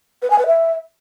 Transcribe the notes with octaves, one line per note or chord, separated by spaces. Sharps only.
B4
G#5
B4
E5